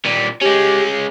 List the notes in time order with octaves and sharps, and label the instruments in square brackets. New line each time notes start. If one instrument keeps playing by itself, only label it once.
[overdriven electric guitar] A#2 G3
[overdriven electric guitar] G#3 C#4 [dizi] G4